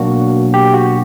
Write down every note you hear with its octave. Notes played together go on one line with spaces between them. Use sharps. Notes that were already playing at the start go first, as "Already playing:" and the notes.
Already playing: B2 F#3 A#3 D4 F#4
G4
F#4